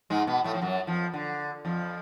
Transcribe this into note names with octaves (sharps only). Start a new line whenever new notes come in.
G#2 G#3
B2 B3
A2 A3
F3
F#2 F#3
F2 F3
D3
F2 F3